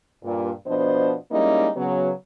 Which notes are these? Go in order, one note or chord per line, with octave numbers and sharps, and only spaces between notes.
G2 A#2
B2 F3 B3 D4 C5 D#5
G3 G#3 A#3 C#4 D#4 E4
C#3 F#3 B3